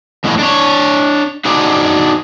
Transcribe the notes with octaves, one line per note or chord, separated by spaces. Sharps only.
F2 A2 E3 G#3
D4 C#5
D4 D#4 F#4 G#4 C5 D5